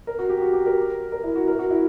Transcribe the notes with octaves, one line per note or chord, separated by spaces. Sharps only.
A#4
F#4
G4
F#4
G4
A#4
A#4
E4
F#4
A#4
F#4
E4